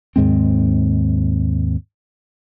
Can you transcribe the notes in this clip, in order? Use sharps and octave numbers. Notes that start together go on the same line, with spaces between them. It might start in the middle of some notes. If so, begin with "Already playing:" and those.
D#2 G#2 G#3 C4